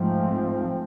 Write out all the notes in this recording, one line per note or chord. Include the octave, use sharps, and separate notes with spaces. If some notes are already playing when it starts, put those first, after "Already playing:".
Already playing: G#2 F3 A3 C4